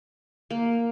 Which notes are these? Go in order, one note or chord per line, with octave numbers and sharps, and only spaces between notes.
A#3